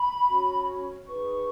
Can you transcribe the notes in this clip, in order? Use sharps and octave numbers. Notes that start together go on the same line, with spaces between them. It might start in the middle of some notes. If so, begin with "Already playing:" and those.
Already playing: B5
C#4 F#4 C#5
D#4 G#4 B4 C#6